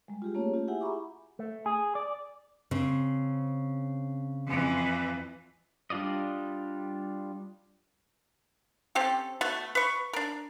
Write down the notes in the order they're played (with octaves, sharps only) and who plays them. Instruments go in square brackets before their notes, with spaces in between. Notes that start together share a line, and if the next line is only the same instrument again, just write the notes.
[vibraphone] G3 G#3
F4 G4 G#4
A3 A#3 C#4 C#5
F4 G4
E4 G4 G#4 E5 F#5 G#5
E5 A#5 B5 C#6 D6
[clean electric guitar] A3
G#4
D5
[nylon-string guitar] C#3 C4
[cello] F2 E3
[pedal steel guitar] G3 D4 F4 D5 D#5
[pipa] C4 C#4 G4 A4
A3 B3 F#4
B4 C#6
D4 A#4